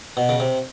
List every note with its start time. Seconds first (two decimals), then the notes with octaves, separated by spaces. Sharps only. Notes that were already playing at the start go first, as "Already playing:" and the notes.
0.17 B2
0.29 C#3
0.40 C3